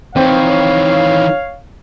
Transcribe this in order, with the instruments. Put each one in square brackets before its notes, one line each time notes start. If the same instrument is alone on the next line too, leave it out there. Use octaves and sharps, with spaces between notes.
[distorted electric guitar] D#3 E3 [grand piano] C4 [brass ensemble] C#5 F5